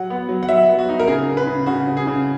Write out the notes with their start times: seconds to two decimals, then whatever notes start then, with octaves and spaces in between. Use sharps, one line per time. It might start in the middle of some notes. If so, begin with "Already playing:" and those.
Already playing: F#3 F#5
0.10 B3
0.29 F#3
0.43 F#5
0.49 F#3 E5
0.69 B3
0.79 F#4
0.89 D#4
1.00 A#4
1.07 C#3 G#4
1.28 C#3
1.37 B4
1.47 C#3
1.66 C#3 F#4
1.87 C#3
1.97 G#4
2.07 C#3